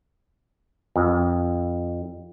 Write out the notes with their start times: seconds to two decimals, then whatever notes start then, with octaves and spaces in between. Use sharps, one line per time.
0.96 F2